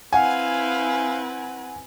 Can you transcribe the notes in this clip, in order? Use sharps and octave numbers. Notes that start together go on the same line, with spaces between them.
C4 E4 B4 F5 F#5 G#5